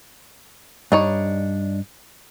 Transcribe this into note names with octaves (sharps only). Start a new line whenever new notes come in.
G2 D4 D#4 C#5